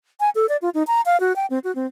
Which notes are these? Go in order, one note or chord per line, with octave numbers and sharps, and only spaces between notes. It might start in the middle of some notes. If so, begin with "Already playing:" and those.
G#5
A4
D5
F4
D#4
A#5
F5
F#4
G5
C4
F#4
C4